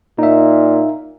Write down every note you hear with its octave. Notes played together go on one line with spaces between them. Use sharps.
A#2 D#4 E5